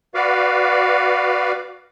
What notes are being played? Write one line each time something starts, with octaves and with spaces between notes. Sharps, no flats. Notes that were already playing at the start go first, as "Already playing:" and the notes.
F#4 B4 D5 F5